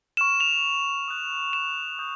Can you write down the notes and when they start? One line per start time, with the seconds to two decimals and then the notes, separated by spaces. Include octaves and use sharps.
0.17 C#6 F6 E7
0.40 F7
1.08 D#6 F#6
1.53 E7
1.99 D#6 G6